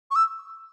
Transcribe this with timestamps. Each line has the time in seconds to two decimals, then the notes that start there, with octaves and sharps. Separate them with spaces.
0.11 C#6
0.16 E6